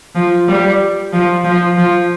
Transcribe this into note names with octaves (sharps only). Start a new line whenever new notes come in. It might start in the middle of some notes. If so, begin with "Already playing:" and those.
F3
G3
F3
F3
F3